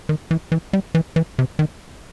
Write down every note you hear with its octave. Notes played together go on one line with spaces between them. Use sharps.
D#3
E3
E3
G3
E3
E3
C3
D#3